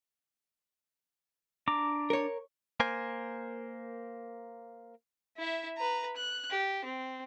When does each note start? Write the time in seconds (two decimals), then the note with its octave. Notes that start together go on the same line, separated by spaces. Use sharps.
1.68 D4 A#5 D6
2.10 A#4 C#5
2.80 A#3 A#4 C5 G#5
5.38 E4 E5
5.78 B4 A#5
6.17 F#6
6.51 G4
6.85 C4